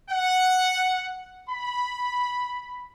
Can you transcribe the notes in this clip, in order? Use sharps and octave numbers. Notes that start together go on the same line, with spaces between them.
F#5
B5